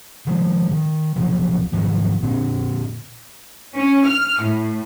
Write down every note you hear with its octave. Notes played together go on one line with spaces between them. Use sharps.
D#3 F3 G#3
D#3
D1 B2 F3 F#3
G#2 D#3 F3 F#3
A#2 D3 C4
C#4
F6
A2